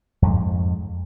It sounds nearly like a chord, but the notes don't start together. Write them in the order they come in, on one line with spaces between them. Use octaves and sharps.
F2 G#2 G#3